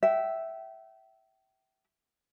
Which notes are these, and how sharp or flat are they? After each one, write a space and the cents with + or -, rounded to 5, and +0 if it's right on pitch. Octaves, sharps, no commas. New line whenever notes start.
E5 +0 G5 -30